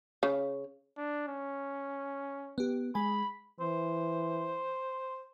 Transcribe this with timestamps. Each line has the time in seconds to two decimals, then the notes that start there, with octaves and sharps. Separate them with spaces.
0.23 C#3
0.97 D4
1.28 C#4
2.58 B3 G4
2.95 G#3 G#5 B5
3.60 E3 C5